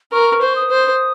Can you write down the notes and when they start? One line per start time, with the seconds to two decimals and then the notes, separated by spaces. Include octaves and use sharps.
0.12 A#4 C#6
0.41 C5
0.56 D#6
0.70 C5